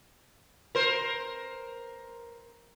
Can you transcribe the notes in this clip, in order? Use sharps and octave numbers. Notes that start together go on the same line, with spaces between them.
A#4 C5